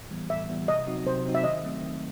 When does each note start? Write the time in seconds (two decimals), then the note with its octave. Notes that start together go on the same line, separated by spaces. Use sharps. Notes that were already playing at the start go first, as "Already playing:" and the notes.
Already playing: A2
0.11 E3 G3 B3
0.30 A2 E5
0.49 E3 G3 B3
0.68 C3 D#5
0.87 F#3 C4 D#4 F#4
1.07 C3 C5
1.24 F#3 C4 D#4 F#4
1.35 E5
1.44 D#3 D#5
1.64 F#3 A3 C4
1.82 D#3